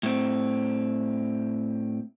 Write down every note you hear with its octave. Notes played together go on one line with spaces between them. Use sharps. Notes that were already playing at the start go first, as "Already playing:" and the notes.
A2 C4